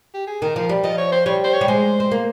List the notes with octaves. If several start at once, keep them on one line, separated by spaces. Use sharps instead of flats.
G4
G#4
D#3 A#4
F3
G3
F3 D#5
C#5
C5
G3 C#5
C5
C#5
G3
G#3 C5
C4
A#3